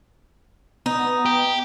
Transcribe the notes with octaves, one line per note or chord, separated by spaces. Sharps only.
B3 D#4
G4